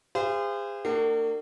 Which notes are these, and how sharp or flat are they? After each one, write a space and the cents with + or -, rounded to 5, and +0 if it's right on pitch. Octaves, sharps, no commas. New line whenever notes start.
G#4 -40 C5 -30 F5 -40
A#3 -40 D4 +30 F#4 +40